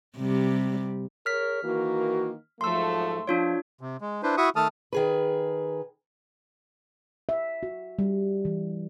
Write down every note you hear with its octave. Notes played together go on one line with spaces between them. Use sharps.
C3 G3
G#4 A#4 C#5 F6 B6
D#3 E3 A#3 F#4
G#2 F3 F#3 A3 C6 E6
F3 D4 F4 C#5
C3
G#3
D4 E4 B4 C5
E4 F#4 E5 C#6 D#6
D#3 A3 A4 A5 D#6 F6
D#3 G#4 B4
E5
F#4
G3
E3